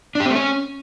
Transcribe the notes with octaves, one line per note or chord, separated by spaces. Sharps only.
D4
G4
C4
A3
C#4